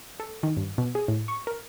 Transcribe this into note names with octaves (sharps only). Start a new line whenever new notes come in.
A4
D#3
G2
B2
G#4
A2
C#6
A#4